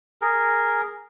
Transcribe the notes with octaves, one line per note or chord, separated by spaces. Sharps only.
G#4 A#4